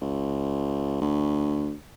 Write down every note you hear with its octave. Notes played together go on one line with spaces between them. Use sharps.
C#2
D2